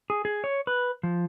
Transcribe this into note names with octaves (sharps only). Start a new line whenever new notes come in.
G#4
G#4
C#5
B4
F3